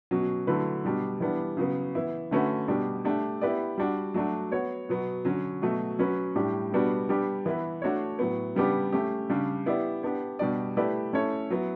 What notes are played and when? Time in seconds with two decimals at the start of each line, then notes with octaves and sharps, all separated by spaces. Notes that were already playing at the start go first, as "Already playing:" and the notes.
0.11 B2 F#3 C#4
0.47 D3 F#3 A3 E4 B4
0.84 B2 G3 D4
1.20 E3 G3 B3 D4
1.57 C#3 F#3 B3
1.95 E3 B3 E4
2.31 D3 A3 C#4 F#4 B4
2.68 B2 G3 D4 G4
3.05 A3 D4 G4
3.41 B3 E4 G4 B4 D5
3.78 G3 D4 F#4
4.14 F#3 A3 D4 F#4
4.52 B3 F#4 C#5
4.89 B2 F#3 B3
5.25 D3 F#3 C#4
5.62 B2 F#3 A3
5.99 F#3 C#4 F#4 B4
6.36 A2 G3 D4 G4
6.72 B2 G3 B3 D4 F#4
7.09 G3 B3 D4 G4
7.46 E3 B3 E4 B4
7.82 A3 D4 F#4 C#5
8.19 A2 F#3 B3
8.55 C#3 G3 B3 D4 G4
8.93 A3 C#4 G4
9.30 C#3 G3 D4
9.66 B3 E4 G4 D5
10.03 B3 D4 G4
10.39 B2 G3 D4 G4 D5
10.77 A3 E4 G4 B4 D5
11.13 A3 C#4 E4 A4 C#5
11.50 F#3 B3 E4